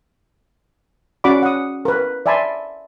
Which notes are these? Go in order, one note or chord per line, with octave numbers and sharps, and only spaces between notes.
C#4 F#4 D5 F#5 B5 D6
F#5 D#6
A#4 B4
D5 E5 G#5 A5 B5 C6